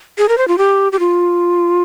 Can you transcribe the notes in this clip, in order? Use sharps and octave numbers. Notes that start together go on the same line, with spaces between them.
G#4
A#4
C5
F4
G4
G4
F4